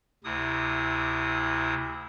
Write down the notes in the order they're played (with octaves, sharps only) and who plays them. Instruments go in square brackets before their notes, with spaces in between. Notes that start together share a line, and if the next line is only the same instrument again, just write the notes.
[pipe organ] D2 C3 E4 D#6